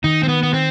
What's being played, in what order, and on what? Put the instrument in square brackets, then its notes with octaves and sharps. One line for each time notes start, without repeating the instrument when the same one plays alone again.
[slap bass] D#3 [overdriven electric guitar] D#4
[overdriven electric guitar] C4
B3
B3
C4